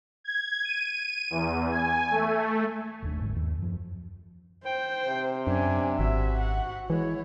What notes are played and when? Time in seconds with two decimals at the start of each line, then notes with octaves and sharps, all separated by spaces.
0.24 G#6
0.64 D#7
1.30 E2
1.70 G#5
2.11 A3
3.02 F1 D#2 D4
3.19 D1 G1 G#2
3.36 D#2
3.58 F#2 F3
4.66 C5 G5
5.08 C3
5.47 F#2 C#4 D4 G#5
5.99 G#1 F#4 E5
6.40 F#5
6.90 E3 G#3 E4 C#5